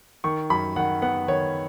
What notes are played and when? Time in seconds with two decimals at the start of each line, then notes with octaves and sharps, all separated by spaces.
0.24 D#3 C#6
0.50 F#2 B5
0.76 D#3 F#5
1.02 B3 F#5
1.28 D#3 C#5